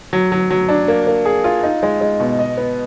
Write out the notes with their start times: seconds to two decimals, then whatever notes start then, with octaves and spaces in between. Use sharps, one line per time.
0.13 F#3
0.32 F#3
0.50 F#3
0.69 D4
0.88 A#3
1.07 A#3
1.26 G#4
1.44 F4
1.63 D#4
1.83 G#3
2.01 G#3
2.20 B2
2.39 D#5
2.57 B3